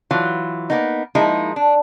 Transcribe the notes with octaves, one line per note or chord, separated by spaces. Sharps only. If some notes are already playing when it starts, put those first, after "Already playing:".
E3 F#3 F4
A#3 B3 D#4
F3 G#3 A#3 D#4 E4
D4